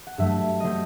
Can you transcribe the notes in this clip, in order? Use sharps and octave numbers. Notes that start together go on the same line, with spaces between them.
F#5
G2 F#3 A3 E5
F#3 A3 C5 D#5